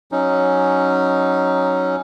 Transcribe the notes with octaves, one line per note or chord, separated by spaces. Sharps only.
F#3 C#4 D#4